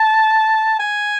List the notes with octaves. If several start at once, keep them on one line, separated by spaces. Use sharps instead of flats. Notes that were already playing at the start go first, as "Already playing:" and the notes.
Already playing: A5
G#5